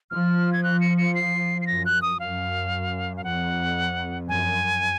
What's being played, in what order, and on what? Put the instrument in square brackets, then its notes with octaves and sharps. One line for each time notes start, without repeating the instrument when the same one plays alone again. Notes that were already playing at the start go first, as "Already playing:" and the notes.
[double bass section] F3 [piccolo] F6
[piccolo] G#6
F#6
C#7
C#7
C7
C7
[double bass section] F#2 [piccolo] A#6
[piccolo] F#6
D#6
[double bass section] F#2 [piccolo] F5
[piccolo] F5
[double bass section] F2 [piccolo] F#5
[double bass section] F#2 [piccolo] G#5